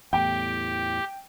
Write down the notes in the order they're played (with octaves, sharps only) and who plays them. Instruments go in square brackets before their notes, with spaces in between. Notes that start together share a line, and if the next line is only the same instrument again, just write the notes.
[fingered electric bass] E2 A2 [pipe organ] G4 [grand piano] G5